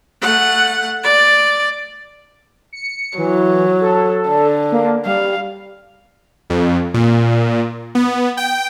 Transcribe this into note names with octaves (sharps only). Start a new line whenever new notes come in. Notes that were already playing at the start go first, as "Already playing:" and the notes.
A3 F#5
D5
C#7
E3 F#3
A4
D3
A#3
G3 F5
F2
A#2
B3
G5